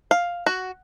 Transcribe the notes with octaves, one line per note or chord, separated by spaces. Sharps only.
F5
F#4